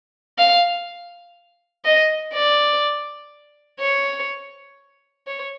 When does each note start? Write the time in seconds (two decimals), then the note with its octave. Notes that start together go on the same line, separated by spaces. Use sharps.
0.38 F5
1.85 D#5
2.34 D5
3.80 C#5
5.27 C#5